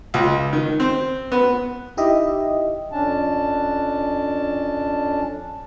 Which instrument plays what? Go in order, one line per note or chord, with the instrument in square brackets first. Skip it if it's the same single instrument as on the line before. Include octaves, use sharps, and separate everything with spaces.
[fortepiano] C#2
D#3
C4
B3
[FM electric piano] D#4 E4 G4 D#5 E5
[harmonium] F2 C#4 D4 A5